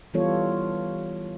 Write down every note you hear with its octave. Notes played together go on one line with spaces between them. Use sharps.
E3 G3 B3 F4 A4 C#5